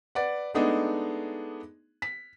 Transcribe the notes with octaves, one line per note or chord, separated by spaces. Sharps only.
B4 D5 F#5
G#3 A3 B3 D4 D#4 G#4
B6